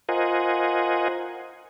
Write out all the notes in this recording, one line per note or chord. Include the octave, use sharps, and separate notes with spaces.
F4 A#4 C5 D#5 F#5 G#5